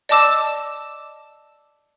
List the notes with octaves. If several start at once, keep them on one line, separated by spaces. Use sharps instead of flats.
D5 D#5 A5 D6 E6 E7